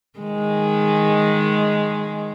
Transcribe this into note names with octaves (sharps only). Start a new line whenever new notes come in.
D#3 G#3